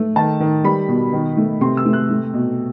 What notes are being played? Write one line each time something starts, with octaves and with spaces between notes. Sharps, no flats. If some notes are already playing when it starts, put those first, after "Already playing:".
Already playing: A3
D#3 A5
D#3
G3 B5
B2
D#3
A3
C3 C6
E6
A3
F#6
A3
B2